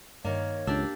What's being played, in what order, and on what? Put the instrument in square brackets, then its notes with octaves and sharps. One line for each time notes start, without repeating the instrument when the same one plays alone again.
[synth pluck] G2 [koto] D#3 A#3 [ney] C#5
[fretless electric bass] C#2 [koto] D4 G4 D5 [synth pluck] E6